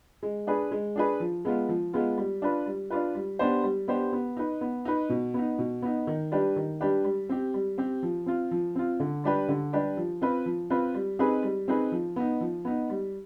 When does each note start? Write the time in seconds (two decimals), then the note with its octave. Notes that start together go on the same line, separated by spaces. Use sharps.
0.23 G#3
0.47 D4 G#4 B4
0.71 G#3
0.96 D4 G#4 B4
1.20 F3
1.45 G#3 B3 F4
1.69 F3
1.93 G#3 B3 F4
2.18 G3
2.42 D4 F4 B4
2.66 G3
2.91 D4 F4 B4
3.15 G3
3.39 B3 D4 G4 C5
3.63 G3
3.88 B3 D4 G4 C5
4.13 B3
4.37 D#4 B4
4.61 B3
4.85 D#4 B4
5.09 B2
5.34 B3 D#4
5.58 B2
5.82 B3 D#4
6.07 D#3
6.32 G3 D4 G4 B4
6.56 D#3
6.81 G3 D4 G4 B4
7.04 G3
7.29 C4 G4
7.54 G3
7.78 C4 G4
8.03 F3
8.26 C4 F4
8.51 F3
8.75 C4 F4
9.00 D3
9.24 G3 D4 G4 B4
9.48 D3
9.73 G3 D4 G4 B4
9.97 F3
10.22 C4 F4 B4
10.46 F3
10.70 C4 F4 B4
10.94 G3
11.19 C4 D#4 G#4 B4
11.43 G3
11.68 C4 D#4 G#4 B4
11.92 F3
12.16 B3 D#4
12.41 F3
12.65 B3 D#4
12.90 G3